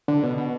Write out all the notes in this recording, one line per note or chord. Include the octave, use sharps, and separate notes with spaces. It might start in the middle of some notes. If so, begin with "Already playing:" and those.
D3
B2
B2